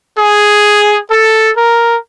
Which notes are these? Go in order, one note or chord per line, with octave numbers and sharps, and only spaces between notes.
G#4
A4
A#4